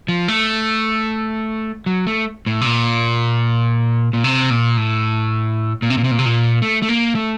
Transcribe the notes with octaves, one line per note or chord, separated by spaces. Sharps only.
F3
A3
F#3
A3
A2
C3
A#2
A#2
C3
A#2
A2
A#2
C3
A#2
C3
A#2
C3
A#2
A3
A3
A#3
A3